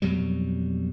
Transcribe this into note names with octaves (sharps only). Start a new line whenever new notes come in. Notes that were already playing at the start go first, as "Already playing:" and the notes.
F2 B2 F#3 G3